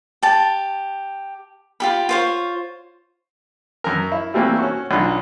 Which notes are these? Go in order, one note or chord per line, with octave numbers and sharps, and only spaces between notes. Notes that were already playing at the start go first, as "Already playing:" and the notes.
G4 A5
F4 G4 B5
F4 C5 C#5
F#2 A#4
E4
E3 G3 A3 A#3 C4
C#4 F#4
B1 C#4 D4 F4 B5